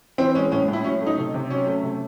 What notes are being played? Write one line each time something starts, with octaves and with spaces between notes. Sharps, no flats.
E3 C4
G#3 C#4
A2 C#4
A2 E4
F#3 C#4
A3 D#4
C3
C3
F#3 C#4
A3
C3